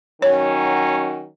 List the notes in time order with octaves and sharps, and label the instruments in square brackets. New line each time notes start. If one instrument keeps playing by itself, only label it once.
[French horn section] D#3 F#3 C#4 F#4 [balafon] C#5